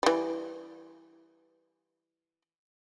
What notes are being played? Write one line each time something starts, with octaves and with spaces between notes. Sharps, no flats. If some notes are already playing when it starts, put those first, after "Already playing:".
E3 G3